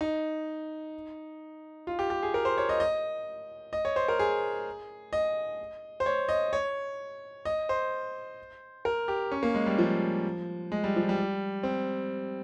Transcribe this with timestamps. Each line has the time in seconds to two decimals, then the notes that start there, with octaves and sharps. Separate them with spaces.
0.01 D#4
1.87 F4
1.99 G4
2.10 G4
2.23 G#4
2.34 A#4
2.45 C5
2.58 C#5
2.69 D#5
2.80 D#5
3.73 D#5
3.85 C#5
3.96 C5
4.08 A#4
4.19 G#4
5.13 D#5
6.00 C5
6.06 C#5
6.29 D#5
6.53 C#5
7.45 D#5
7.69 C5
8.85 A#4
9.08 G4
9.32 C#4
9.43 A#3
9.55 G#3
9.66 G3
9.78 F3
10.72 G#3
10.84 G3
10.96 F3
11.09 G3
11.63 C4